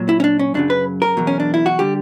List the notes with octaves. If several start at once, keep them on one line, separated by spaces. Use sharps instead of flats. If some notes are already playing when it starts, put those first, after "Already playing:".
Already playing: A#2 F#3
E4
C#4
D4
C#4
F#2 C#3 F#3 D4
B4
A#4
E2 B2 F#3
C#4
D4
E4
F#4
D3 G3 G4